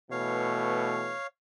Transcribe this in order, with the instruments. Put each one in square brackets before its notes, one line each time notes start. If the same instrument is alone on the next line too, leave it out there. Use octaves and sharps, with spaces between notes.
[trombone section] B2 E3 A3 [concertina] C#5 F5